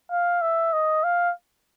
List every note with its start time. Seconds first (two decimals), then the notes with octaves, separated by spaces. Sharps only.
0.11 F5
0.42 E5
0.73 D#5
1.04 F5